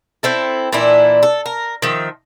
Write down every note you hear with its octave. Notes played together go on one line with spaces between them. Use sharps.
C4 E4 A4
A#2 E3 D4 E4
A4
A#4
D#3 F3 E5